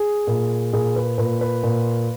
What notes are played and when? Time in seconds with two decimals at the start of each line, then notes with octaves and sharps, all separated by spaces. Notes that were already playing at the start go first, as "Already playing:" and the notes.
Already playing: G#4
0.27 A#2
0.73 A#2 G#4
0.96 B4
1.18 A#2 B4
1.41 B4
1.63 A#2